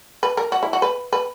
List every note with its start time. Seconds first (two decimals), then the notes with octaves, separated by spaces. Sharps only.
0.23 B4
0.37 A#4
0.52 F#4
0.63 E4
0.73 F#4
0.82 B4
1.13 B4